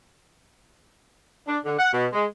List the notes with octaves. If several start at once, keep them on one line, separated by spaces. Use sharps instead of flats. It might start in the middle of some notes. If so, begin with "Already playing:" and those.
D4
D3
F#5
B2
G#3